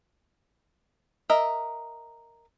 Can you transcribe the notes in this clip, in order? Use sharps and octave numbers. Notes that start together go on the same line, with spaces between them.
A#4 D#5 E5